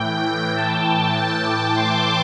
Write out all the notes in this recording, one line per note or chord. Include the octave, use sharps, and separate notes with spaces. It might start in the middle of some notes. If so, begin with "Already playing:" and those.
Already playing: A2 E3 G5
A5
D6
C6